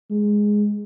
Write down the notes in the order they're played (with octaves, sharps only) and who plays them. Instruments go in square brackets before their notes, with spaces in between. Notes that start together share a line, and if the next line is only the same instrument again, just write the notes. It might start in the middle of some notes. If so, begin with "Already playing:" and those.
[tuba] G#3